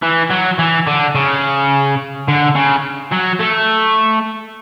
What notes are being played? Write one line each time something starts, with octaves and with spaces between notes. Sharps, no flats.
E3
F#3
E3
D3
C#3
D3
C#3
F#3
A3